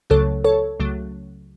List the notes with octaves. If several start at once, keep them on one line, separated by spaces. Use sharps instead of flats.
C#2 C#3 F#3 A3 A4 C#5
A4 C#5
C#2 C#3 F#3 A3